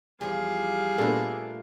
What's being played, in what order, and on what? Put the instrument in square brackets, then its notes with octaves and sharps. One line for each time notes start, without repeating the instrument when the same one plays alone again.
[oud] E2 F3 [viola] G3 F5 [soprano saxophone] G#4
[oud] A#2 A3 [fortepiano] B3 D4 A4